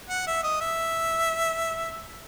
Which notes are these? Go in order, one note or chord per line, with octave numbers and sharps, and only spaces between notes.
F#5
E5
D#5
E5